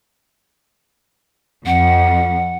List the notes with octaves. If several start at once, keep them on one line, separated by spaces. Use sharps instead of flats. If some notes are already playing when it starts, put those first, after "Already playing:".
F2 F#5